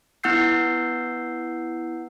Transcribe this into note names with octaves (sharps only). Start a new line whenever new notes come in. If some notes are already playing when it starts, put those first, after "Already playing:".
B3 E4 F#5 E6 G6 C7